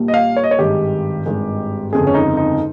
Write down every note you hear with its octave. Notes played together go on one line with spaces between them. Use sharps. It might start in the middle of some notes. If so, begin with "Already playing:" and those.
Already playing: A#1 A#2 G3 A#3
D#5
F5
C#5
D#5
C#5
G#1 G2 D#3 G#3 G4
G#1 G2 D#3 G#3
G1 F2 C#3 G#3 G#4
C#4
D#4
D#4